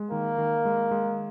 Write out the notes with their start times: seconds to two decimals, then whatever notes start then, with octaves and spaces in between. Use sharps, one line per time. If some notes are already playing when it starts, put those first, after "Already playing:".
Already playing: G#3
0.11 D#3 A#3
0.38 D#3
0.65 G#3
0.91 G#3